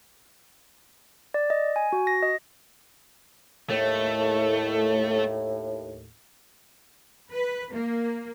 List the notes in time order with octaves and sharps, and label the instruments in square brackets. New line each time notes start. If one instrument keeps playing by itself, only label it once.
[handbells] D5
D#5
G#5
F#4
A#6
D#5
[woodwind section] D#2 A2 [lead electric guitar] A3
[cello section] B4
A#3